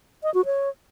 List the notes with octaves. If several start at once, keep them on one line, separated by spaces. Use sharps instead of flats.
D#5
F#4
C#5